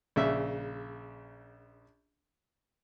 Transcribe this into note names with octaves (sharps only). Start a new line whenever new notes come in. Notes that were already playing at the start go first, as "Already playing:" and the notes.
A#1 C#3 E5